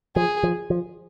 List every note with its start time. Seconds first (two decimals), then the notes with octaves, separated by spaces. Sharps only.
0.16 F3 G#4
0.43 F3
0.70 F3